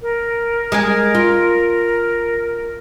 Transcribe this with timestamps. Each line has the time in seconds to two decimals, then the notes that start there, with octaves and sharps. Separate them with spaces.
0.02 A#4
0.72 G#3 G#4
1.15 F4